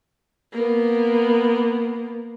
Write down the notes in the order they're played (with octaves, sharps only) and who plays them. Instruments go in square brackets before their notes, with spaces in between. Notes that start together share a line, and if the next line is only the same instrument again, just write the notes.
[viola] A#3 B3